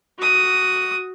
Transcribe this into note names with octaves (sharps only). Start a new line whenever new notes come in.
F#4 D#6